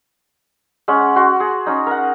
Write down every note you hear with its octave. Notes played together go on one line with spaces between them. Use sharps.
G#3 C#4 F#5
F#4 C6
G#4
C#4 D#4
A#4 F#5